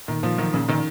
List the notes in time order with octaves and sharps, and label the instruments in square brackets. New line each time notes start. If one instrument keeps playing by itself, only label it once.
[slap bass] A#2 [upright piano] D#3
[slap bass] A#2 [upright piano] F3
[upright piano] D#3 [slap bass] F#3
[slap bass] A#2 [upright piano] C#3
[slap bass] A#2 [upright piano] D#3